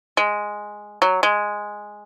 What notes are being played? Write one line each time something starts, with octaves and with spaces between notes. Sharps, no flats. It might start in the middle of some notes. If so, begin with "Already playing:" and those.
G#3
F#3
G#3